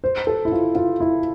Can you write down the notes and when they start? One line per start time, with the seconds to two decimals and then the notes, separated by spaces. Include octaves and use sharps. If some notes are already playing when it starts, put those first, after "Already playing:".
0.04 C5
0.27 A4
0.45 E4
0.52 F4
0.75 F4
1.00 E4